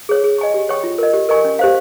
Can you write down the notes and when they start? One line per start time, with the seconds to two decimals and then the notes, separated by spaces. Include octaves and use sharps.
0.09 G#4 C#5
0.24 G#4
0.39 D#5 G#5 C#6
0.54 G4
0.69 C#5 G5 C#6
0.84 F4
0.98 A#4 D#5
1.14 G4
1.29 A#4 D#5 G#5 C#6
1.45 C#4
1.59 G4 C5 F5